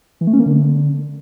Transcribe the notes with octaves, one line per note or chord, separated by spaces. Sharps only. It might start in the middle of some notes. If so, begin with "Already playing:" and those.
E3
A3
C#4
A#3
D3